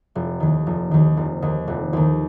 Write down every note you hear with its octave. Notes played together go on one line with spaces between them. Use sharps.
F1
D#2 D#3
F1
D#2 D#3
F1
D#2 D#3
F1
D#2 D#3